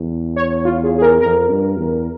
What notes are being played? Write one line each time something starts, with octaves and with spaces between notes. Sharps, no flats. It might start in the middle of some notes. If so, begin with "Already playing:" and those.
Already playing: E2
C#5
F4
G#4
G#4
A#4
F2 A#4
G2
E2